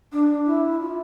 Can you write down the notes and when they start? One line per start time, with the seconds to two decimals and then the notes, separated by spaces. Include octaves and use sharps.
0.13 D4
0.46 E4
0.80 F4